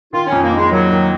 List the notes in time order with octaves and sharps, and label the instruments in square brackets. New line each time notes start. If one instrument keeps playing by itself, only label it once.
[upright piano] D#3 [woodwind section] F4
[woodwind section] C#4
[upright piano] F2
[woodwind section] A#3
[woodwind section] G#3 [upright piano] D#4
[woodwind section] F#3 [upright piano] A#3
[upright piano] D#3